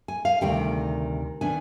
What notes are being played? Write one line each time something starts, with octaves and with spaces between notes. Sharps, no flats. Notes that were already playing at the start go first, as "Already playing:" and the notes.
G#5
F5
D2 C3 D#3 G3 G5
D#3 B3 D4 G#5